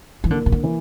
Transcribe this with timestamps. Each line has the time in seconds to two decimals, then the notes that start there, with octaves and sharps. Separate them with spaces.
0.24 E3
0.30 D3 A#3
0.46 C3
0.52 D3
0.63 E3